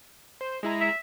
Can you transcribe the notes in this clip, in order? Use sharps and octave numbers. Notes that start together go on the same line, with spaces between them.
C5
G#3 E4 A#5
E5